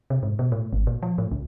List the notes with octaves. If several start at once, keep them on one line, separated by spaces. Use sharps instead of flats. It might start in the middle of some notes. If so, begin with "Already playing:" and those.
C3
G#2
B2
A2
G#1
A#2
F3
A2
C#2